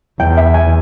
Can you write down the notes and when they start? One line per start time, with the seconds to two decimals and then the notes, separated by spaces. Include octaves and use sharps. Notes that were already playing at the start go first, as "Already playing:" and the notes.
0.20 E2 G5
0.37 E5
0.54 G#5